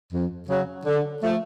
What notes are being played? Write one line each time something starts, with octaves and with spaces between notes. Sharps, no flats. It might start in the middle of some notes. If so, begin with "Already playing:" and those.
F2
C#3 F#3
D3
F3 A3